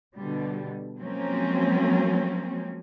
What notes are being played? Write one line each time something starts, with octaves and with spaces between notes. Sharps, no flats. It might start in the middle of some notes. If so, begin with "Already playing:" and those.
B2 D3 G3
F3 F#3 G#3 A#3 C4 C#4